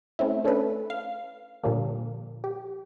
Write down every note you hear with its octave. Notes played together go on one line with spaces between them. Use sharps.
A3 C4 C#4 E4
A3 C#4 D4 A4 B4
F5
A#2 D3 F3 G3 A#3
G4